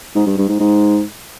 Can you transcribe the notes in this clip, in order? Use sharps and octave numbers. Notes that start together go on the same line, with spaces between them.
G#2
G2
G2
G#2
G#2